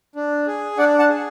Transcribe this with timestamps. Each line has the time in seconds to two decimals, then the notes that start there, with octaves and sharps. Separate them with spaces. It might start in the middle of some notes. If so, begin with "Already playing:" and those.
0.15 D4
0.47 G#4
0.78 D4 D5 F#5
0.99 F#5 A5
1.09 G#4